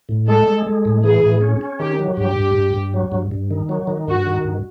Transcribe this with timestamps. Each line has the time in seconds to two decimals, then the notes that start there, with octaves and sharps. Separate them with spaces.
0.09 A2
0.28 G#3 A4
0.48 G#3
0.66 G#3
0.85 A2
1.04 E3 G#4
1.23 A2
1.41 C#4
1.61 C#4
1.80 D#3 G4
1.99 F#3
2.17 G2 G4
2.37 G2
2.55 G2
2.74 G2
2.94 F#3
3.12 G2
3.31 G2
3.50 D#3
3.69 F#3
3.87 D#3
4.07 G2 F#4
4.26 D#3
4.45 G2